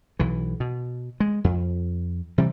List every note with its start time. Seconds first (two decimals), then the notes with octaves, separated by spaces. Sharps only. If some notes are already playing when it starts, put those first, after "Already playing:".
0.19 B1 E3
0.60 B2
1.20 G#3
1.44 F2
2.38 C3 E3 G3